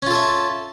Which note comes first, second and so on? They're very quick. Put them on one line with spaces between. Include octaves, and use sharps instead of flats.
C#4 F4 A4 E5